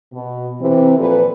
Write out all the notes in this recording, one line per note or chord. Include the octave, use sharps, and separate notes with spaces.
B2
C3 E3 C4
A#2 F3 A4 B4